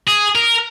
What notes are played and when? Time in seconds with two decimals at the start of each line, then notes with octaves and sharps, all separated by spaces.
0.07 G#4
0.35 A#4